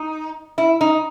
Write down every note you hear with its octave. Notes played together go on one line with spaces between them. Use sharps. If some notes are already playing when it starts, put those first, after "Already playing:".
Already playing: D#4
E4
D#4